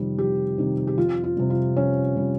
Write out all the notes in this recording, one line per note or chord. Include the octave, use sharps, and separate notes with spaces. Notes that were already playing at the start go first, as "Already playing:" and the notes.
Already playing: F2 C3 D#3 G3
F2 G4
C3 D#3 G3
G4
F2 F4
F4
C3 G3
F4
F2 C#4
C3 G3